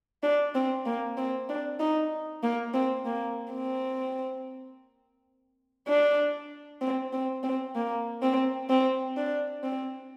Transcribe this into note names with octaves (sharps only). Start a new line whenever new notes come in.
D4
C4
A#3
C4
D4
D#4
A#3
C4
A#3
C4
D4
C4
C4
C4
A#3
C4
C4
D4
C4